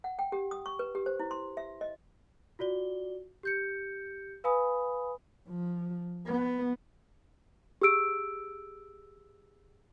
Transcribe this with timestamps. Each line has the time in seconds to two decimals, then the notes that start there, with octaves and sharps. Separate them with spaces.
0.04 F#5
0.19 G5
0.32 G4
0.51 D#6
0.66 C#6
0.79 B4
0.95 G4
1.06 C5
1.19 E4
1.31 C6
1.57 E5
1.81 D#5
2.59 F4 F#4 D5 G7
3.43 G4 G6 C#7
4.44 B4 F5 G#5 B5 D#6
5.49 F3
6.27 B3
7.82 G4 G#4 E6 D7